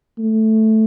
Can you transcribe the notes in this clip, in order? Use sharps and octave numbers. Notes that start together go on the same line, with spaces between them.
A3